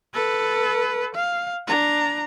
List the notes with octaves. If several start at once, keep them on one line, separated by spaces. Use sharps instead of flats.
A4 B4
F5
D4 A#5